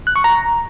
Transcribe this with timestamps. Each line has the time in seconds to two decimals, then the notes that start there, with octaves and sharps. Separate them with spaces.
0.07 F#6
0.16 C#6
0.24 A#5